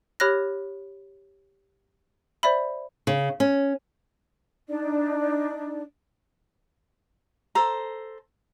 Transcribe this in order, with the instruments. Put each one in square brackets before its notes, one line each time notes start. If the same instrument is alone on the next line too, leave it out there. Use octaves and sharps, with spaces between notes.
[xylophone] G4 C#5 B5 F6 F#6 A#6
C5 D5 E5 B5
[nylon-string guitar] C#3
C#4
[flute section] D4 D#4 D5
[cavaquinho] A4 C5 A#5